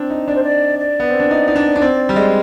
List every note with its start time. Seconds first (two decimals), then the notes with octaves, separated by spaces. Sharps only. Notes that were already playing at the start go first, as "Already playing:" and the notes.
Already playing: C4 D4
0.10 D#4
0.27 D4 D5
0.35 C5
0.43 D5
0.79 D5
1.00 B3
1.10 C4
1.20 D4
1.31 D#4
1.48 D#4
1.56 D4
1.76 D4
1.82 C4
2.09 G3
2.16 G#3